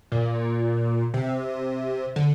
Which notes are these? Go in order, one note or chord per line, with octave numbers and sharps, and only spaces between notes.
A#2
C3
D3